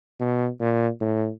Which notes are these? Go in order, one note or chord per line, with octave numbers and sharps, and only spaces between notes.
B2
A#2
A2